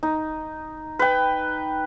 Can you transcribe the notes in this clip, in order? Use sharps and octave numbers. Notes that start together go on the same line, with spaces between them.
D#4
B4 G5